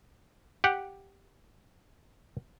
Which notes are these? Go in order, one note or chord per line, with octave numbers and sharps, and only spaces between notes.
G4 F#5